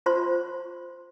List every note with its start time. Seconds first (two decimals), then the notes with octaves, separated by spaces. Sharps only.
0.06 F4 C5 C6